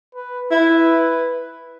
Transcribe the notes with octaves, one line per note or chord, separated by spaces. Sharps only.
B4
E4 B4